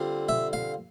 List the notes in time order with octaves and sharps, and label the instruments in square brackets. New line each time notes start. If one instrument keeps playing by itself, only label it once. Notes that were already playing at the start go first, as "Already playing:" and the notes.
Already playing: [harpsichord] D3 G3 C4 F4
E5
F5